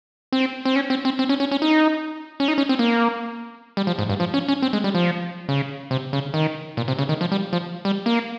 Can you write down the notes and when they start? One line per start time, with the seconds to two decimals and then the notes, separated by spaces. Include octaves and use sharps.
0.32 C4
0.65 C4
0.76 C#4
0.90 C4
1.05 C4
1.19 C4
1.29 C#4
1.40 C#4
1.51 C#4
1.62 D#4
2.40 C#4
2.48 D#4
2.58 C#4
2.69 C4
2.79 A#3
3.77 G3
3.87 F3
3.99 G#2
4.09 G2
4.20 F3
4.34 C#4
4.48 C#4
4.62 C4
4.73 G#3
4.84 G3
4.95 F3
5.49 C#3
5.91 C3
6.13 C#3
6.34 D#3
6.77 A#2
6.88 C3
6.99 C#3
7.09 D#3
7.21 F3
7.32 G3
7.53 F3
7.85 G3
8.06 A#3